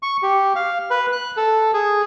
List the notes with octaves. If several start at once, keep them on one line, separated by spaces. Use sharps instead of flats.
C#6
G4
F5
B4
F#6
A4
G#4